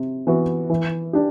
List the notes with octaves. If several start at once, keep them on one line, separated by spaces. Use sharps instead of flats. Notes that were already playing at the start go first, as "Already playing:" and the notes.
Already playing: C3
E3 B3 F#4 B4
E3
D4 G4